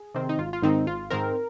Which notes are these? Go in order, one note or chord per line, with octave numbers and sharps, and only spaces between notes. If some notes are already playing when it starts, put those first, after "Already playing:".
Already playing: G#4
C3 D#3 C4
D#4
G#1 F4
F4
G#2 D#3 C4 D#4
G#1 F4
G#2 D#3 C4 A#4